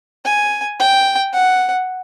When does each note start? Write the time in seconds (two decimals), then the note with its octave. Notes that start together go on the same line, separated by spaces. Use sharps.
0.25 G#5
0.80 G5
1.33 F#5